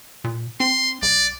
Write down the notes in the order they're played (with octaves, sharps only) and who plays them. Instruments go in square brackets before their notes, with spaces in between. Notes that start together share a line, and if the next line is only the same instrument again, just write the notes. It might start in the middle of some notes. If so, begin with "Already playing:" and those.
[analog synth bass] A#2
[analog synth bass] C4 [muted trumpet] C6
[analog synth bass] B1 [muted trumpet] D5